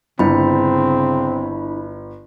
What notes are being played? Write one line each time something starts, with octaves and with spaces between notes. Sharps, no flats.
G1 C#3 C4 D4 E4 B5